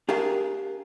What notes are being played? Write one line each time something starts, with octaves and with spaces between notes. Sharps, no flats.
D4 G4 G#4 A#4 F5 A5